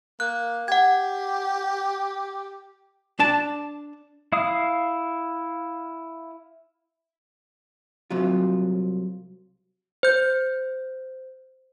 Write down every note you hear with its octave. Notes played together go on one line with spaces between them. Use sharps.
A#3 F#6
G4 F#5 G#6
D4 A5
E4 F5 D#6
C2 C3 F#3 F4
C5 G6